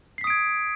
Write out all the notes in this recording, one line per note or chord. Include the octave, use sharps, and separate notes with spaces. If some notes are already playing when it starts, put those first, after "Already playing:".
D#6 G#6 B6 C7 D7